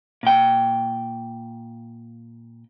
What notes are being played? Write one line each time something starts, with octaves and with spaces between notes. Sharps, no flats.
A#2 G5